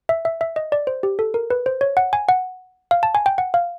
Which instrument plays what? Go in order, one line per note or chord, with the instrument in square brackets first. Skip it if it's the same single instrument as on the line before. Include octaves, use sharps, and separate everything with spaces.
[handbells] E5
E5
E5
D#5
D5
C5
G4
A4
A#4
B4
C5
C#5
F#5
G#5
F#5
F5
A5
G#5
G5
F#5
F5